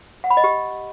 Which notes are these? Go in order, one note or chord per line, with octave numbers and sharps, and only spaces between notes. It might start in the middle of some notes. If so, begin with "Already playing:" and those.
F#5
B5
D#5
G4